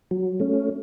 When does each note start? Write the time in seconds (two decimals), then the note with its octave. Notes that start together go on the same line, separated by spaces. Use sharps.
0.11 F#3
0.40 A3 C#4